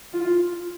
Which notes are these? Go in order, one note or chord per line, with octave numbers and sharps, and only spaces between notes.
F4